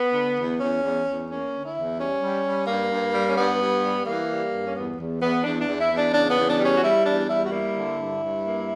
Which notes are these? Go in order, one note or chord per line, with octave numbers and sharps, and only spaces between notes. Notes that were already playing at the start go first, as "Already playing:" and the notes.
Already playing: B3
D3
E2
E2 C#4
E2
E2
A#3 C#4
D3
E4
E2
G3 C#4
G3
G3
G2 A#3
G2
G3
C#4
G2 B3
G2
G3
E3 A#3
G3
G2
C#4
E2 B3
E2
E2 B3
E2 D4
D4
E2
E4
E2
D4
C#3 D4
B3
E2
D4
G3
C#4
F#4
G3 E4
E2 D4
G3 E4
F#4
A#3 E4
D3
G2
G2
A#3